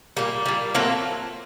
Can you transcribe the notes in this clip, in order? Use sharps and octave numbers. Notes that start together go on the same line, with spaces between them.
A#2 G3 A#3
A#2 G3
A#2 F#3 A3 A#3 C4